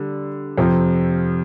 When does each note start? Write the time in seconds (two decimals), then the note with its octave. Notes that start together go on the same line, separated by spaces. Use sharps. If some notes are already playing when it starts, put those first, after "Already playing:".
Already playing: D3 G3
0.58 F2 C3 F3 C4